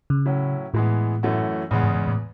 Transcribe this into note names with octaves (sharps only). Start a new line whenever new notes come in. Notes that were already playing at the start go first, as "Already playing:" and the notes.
C#3
A2 F#3 C#4 E4
A2 E3 G#3 B3
F#2 E3 A3 C#4 F#4
E2 A2 C#3 G#3 B3
G#2
G#2
A2